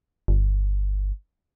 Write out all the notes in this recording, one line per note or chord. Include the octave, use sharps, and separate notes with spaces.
G1